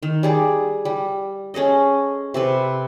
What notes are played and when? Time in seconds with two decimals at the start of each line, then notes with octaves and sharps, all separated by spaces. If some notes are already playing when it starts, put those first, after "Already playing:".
0.03 D#3
0.23 G3 G#4 D5
0.85 G3
1.54 C#4 G#4 A4 D#5
2.34 C3 A4 B4